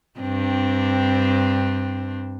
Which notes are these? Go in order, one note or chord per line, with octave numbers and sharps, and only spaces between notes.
G2 C4 D4